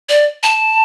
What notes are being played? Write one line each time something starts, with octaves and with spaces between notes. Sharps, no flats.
D5
A5